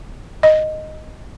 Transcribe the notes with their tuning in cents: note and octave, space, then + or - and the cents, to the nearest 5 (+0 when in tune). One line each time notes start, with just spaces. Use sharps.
D#5 -5